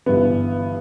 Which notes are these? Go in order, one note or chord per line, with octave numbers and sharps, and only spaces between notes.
G1 G2 E3 B3